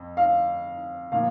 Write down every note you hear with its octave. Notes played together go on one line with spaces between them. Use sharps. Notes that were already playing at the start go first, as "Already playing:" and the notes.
Already playing: F2
F5
A#2 F3 F5